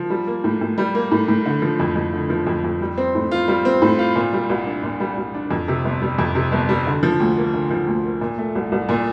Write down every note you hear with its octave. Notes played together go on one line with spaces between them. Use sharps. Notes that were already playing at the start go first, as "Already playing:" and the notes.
Already playing: F3
G3
A#3
A2
A2
G3
A#3
A2
A2
D3
F3
F2
F2
D3
F3
F2
F2
G3
C4
A2
F4
G3
C4
A2
F4
A#2
G3
C2
D4
A#2
G3
C2
D4
F2
C3
G1
G3
F2
C3
G1
G3
D3
F3
D2
A#3
D3
F3
D2
A#3
A#2
A3
C2
C2
A#2